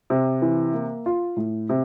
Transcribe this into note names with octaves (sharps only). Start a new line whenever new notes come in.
C3
E3
A#3
F4
A2
C3